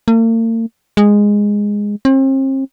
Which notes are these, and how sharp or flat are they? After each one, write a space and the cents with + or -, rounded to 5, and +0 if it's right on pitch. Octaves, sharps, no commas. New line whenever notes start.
A#3 -45
G#3 -10
C4 +40